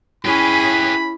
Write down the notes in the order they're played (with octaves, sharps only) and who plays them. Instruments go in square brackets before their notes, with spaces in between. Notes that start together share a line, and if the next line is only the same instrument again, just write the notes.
[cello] C#4 G#4 [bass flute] E4 [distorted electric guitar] G4 B4 [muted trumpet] B5